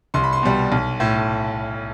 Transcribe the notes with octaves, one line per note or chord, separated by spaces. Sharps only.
C2 C6
B5
C6
B2 G3
B1
A2